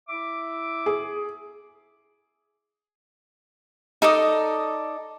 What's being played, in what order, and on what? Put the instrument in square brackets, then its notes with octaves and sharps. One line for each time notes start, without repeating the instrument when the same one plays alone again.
[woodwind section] E4 E5 D6
[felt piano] G#4
[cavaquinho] D#4 A4 D5 D#5